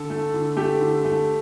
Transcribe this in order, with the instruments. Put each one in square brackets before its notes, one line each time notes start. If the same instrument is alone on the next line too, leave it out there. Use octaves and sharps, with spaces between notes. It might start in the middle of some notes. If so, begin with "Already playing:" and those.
Already playing: [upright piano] D3 A4
A3
D3
A3 G4
D3
A3